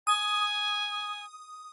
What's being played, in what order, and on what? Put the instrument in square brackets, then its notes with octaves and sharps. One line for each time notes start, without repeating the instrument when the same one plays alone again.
[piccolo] G#5 [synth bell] D#6